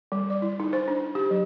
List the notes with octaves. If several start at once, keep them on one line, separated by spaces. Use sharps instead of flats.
G3
D5
E4
D#4
C5
D4
G4
F#3